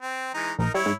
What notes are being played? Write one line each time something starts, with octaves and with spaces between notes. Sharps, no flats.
C4
E3 G#3 D#4
A#1 D#4 A#4
G3 E4 C#5
G#2